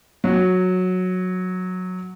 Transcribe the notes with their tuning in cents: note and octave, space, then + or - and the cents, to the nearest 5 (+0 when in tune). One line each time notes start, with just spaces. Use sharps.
F#3 -10